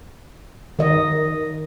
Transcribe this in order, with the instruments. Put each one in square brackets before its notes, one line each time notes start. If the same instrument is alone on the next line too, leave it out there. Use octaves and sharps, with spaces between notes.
[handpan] D#3 D#5